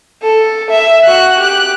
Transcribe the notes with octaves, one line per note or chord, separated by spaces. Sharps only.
A4
E5
F#4 F#6
G4 F#6